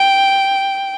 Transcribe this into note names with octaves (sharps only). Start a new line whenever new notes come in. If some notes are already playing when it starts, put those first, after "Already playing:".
Already playing: G5